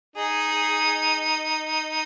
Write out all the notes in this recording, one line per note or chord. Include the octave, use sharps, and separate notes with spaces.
D#4 G#4